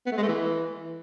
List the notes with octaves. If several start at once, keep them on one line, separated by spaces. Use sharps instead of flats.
B3
A3
G#3
A3
E3